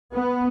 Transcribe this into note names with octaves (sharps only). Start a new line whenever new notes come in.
B3